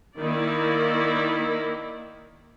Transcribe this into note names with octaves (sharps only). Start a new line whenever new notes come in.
D#3 A#3 E4 D5